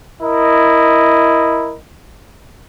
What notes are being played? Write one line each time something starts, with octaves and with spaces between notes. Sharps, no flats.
E4 A#4 D#5